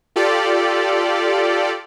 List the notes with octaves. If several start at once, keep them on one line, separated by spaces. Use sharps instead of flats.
F4 G4 A4 D5